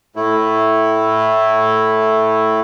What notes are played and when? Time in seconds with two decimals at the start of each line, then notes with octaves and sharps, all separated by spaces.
0.16 A2 A3 E4